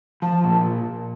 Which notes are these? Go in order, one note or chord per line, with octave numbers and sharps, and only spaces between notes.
F3 A5
A#2